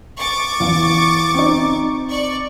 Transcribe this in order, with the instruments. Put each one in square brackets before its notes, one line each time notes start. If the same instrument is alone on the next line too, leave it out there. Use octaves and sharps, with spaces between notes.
[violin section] C#6 D6 A6
[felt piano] E2 F5
C4 D#4
[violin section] D5 C#6